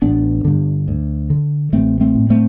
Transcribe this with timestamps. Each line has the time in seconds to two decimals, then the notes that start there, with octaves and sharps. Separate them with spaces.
0.02 A1 B3 D4
0.45 G2 D3
0.88 D2
1.30 D3
1.73 A1 A3 C4
2.01 A3 C4
2.15 A2
2.30 A3 C4